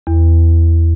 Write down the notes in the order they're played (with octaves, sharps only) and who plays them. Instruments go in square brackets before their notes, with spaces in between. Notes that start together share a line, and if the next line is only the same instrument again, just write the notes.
[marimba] E2